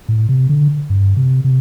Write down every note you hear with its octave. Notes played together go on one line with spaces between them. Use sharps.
A2
C3
D3
G2
C3
C3